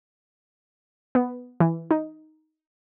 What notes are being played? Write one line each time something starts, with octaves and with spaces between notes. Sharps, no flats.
B3
E3
D#4